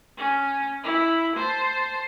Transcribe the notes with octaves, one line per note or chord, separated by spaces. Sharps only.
C#4
E4
C5 A5